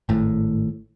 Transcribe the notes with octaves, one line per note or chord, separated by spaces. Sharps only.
G#1 A2